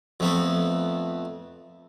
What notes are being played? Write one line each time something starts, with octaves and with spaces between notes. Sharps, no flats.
F2 A3 B3